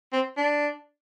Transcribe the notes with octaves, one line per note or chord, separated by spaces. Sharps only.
C4
D4